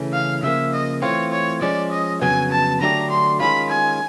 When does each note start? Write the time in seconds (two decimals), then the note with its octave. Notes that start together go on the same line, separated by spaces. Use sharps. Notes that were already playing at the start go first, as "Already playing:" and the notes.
Already playing: C#3 E3 A3 C#4
0.13 F5
0.43 C#3 F3 A#3 E5
0.73 D#5
1.02 E3 A3 C4 F4 C#5
1.32 C#5
1.62 F3 G#3 C#4 D5
1.92 D#5
2.22 F2 C#3 F#3 B3 G#5
2.52 A5
2.81 D3 F#3 A3 D4 G4 A#5
3.10 C6
3.40 D#3 G#3 C#4 F4 B5
3.70 G#5